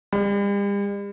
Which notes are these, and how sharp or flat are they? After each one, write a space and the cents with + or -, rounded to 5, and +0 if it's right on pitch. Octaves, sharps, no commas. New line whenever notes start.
G3 +45